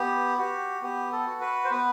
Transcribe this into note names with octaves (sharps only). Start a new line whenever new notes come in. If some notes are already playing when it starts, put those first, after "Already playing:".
Already playing: B3 G4
F#4 G4
B3 G4
A4
F#4
B4
C5
B3 B4